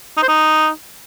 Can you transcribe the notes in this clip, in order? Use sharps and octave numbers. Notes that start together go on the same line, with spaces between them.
D#4
C5
D#4